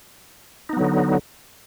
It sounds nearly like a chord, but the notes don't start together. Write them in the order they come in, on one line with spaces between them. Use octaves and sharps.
D#4 B3 F#3 D3